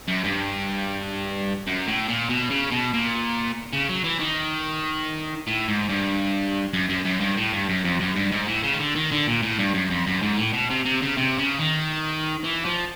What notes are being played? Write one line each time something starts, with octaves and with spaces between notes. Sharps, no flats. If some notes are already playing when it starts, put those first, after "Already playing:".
F#2
G2
F#2
A2
A#2
B2
C#3
B2
A#2
C#3
F#3
E3
D#3
A2
G#2
G2
F#2
F#2
F#2
G2
A2
G2
F#2
F2
F#2
G2
G#2
A2
C#3
D#3
D3
D#3
D3
A#2
A2
G2
F#2
F2
F#2
G#2
A2
B2
C3
C3
C#3
C3
C#3
D#3
E3
F3